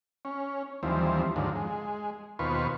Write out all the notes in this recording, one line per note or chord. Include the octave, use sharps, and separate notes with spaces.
C#4
D#2 E3 F3 G3 C4
D#2 G#2 D3 F3 F#3
G#3
D#2 B2 F4 B4 C5 C#6